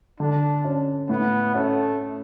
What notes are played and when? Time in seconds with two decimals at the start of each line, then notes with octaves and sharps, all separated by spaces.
0.20 D3 D4
0.65 C#4
1.09 A2 B3
1.54 A3 C#4